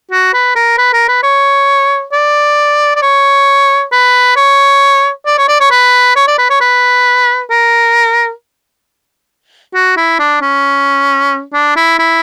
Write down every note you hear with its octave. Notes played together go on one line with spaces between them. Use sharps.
F#4
B4
A#4
B4
A#4
B4
C#5
D5
D5
C#5
B4
C#5
D5
C#5
D5
C#5
B4
C#5
D5
B4
C#5
B4
A#4
F#4
E4
D4
C#4
D4
E4
E4